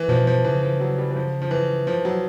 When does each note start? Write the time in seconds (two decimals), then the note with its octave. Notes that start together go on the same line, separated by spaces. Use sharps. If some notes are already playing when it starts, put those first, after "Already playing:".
Already playing: E3
0.09 B2 F3
0.27 F3
0.44 C#3 E3
0.62 F3
0.80 F#3
0.98 G3
1.11 E3
1.16 F3
1.42 F3
1.51 E3
1.87 C3 F3
2.05 F#3